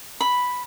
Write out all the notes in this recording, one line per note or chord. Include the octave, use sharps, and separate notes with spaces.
B5